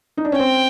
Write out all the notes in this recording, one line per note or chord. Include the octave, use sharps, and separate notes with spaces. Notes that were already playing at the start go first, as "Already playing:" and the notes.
D#4
D4
C#4
C4 G5